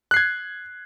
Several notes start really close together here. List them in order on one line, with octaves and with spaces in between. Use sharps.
F#6 C7 G#6